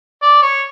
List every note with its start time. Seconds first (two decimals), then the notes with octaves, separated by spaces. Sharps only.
0.23 D5
0.42 C#5